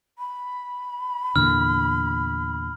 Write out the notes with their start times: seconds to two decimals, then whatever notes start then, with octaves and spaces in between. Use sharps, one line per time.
0.18 B5
1.36 E2 A#2 D3 F6